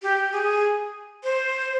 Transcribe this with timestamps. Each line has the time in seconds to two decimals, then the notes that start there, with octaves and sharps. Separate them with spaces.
0.02 G4
0.32 G#4
1.23 C5